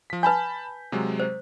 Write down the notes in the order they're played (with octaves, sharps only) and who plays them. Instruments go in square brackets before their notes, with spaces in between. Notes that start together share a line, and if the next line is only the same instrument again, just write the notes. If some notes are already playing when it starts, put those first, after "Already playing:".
[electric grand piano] F3 B6
[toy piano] B4 G#5 [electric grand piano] A5 B5 G6
[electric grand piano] C3 F#3 G#3
[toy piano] C5